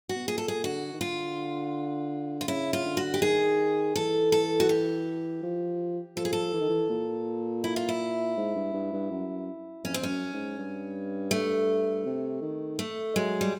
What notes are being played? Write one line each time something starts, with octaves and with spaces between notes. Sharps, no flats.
F#4
B2
A#2 G#4
A4
G#4
D3 F#4
D#3
D3 F4
F4
C#3 E4
F4
D3
F#4
G4
D#3 G#4
E3 A4
A4
F#4
G4
F3
F3 A4
G#4
A4
E3
D#3
E3
A#2
E4
F4
E4
G#2
G2
G2
G2
F#2
F2 C#4
C4
F2
C#4
F#2
G#2
G2
A3
C3
D#3
A3
F#3 G#3
G3